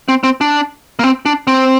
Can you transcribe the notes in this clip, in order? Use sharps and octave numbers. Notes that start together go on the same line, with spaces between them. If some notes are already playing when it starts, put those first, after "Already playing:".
C4
C4
D4
A#3
C4
D4
C4